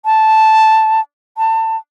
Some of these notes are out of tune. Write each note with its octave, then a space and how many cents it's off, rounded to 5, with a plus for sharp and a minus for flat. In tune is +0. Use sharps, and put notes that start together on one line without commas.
A5 -5
A5 +25